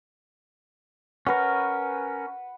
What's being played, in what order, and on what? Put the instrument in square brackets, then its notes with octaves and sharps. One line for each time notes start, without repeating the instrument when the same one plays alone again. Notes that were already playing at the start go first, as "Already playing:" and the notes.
[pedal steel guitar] C#4 A#4 [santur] B4 F#5